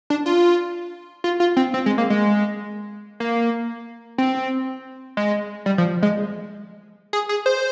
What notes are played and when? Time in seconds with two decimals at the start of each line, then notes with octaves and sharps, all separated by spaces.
0.10 D4
0.26 F4
1.24 F4
1.40 F4
1.57 C4
1.74 C4
1.86 G#3
1.98 A#3
2.10 G#3
3.20 A#3
4.18 C4
5.17 G#3
5.66 G3
5.78 F3
6.03 G#3
7.13 G#4
7.29 G#4
7.46 C5